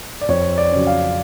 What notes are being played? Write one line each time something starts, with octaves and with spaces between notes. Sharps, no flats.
D5
F2 C#5
D5
C#3 F#3 C#4
F5